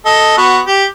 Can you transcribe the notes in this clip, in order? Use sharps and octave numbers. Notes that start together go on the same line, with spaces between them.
A4 D#5
B3 F#4
G4